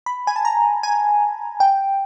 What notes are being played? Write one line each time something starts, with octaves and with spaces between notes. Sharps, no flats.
B5
G#5
A5
A#5
G#5
G5